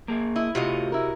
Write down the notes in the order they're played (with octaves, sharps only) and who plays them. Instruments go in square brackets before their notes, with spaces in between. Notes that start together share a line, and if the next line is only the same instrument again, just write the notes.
[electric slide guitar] A#3 G#4
[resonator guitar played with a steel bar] E4 [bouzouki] D#5
[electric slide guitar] A2 F4 [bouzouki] C3 F#4 D#5
[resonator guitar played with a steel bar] E4 A#4